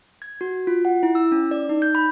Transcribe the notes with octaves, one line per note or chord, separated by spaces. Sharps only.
G#6
F#4
F4
F#5
E4
E6
C#4
D5
D#4
G6
B5